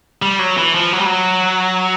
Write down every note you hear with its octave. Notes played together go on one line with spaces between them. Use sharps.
G3
F#3
E3
F3
F#3
G3
F#3